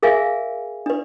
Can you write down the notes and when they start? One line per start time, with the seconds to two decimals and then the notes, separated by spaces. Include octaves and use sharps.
0.03 G#4 A#4 E5 F5 G#5
0.86 D4 B4